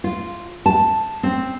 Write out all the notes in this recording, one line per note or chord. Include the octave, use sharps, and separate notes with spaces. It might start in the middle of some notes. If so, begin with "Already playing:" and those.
F4
A5
C4